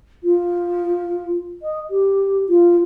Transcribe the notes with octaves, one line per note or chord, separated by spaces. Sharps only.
F4
D#5
G4
F4